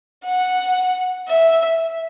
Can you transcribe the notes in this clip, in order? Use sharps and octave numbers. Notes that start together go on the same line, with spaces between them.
F#5
E5